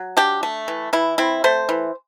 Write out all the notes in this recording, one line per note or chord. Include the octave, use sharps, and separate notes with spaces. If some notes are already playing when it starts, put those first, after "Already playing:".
Already playing: F#3
D4 G4
A3
E3
E3 E4
C4 E4
A3 C5
E3